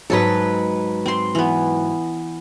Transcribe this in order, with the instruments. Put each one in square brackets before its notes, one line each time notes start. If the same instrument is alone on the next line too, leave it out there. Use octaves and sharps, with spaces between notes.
[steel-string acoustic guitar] G#2 F#3 B4 [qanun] D#4 A4
[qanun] C4 C6
E3 B3